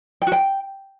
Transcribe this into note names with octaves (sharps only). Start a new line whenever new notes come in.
G5
F#4
G5